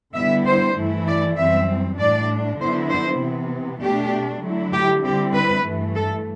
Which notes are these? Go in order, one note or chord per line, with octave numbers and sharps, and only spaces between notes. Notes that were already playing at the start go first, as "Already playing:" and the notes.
D3 G3 B3 E4 E5
C5
G2 E3 A3 E4
D5
F#2 E3 G3 C4 E5
A2 G3 D4 D5
D3 F#3 B3 E4 C5
C5
C3 E3 B3
B2 A3 D4 G4
D3 F#3 A3 E4
G4
D3 G3 C4 E4 G4
B4
G2 E3 A3
A4